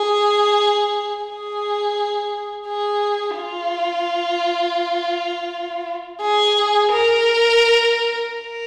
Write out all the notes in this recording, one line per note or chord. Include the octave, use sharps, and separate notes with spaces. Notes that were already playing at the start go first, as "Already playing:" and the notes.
Already playing: G#4
G#4
G#4
F4
G#4
A#4
A#4